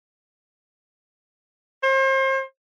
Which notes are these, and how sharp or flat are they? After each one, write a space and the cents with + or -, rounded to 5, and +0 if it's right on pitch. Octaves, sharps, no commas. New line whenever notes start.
C5 +35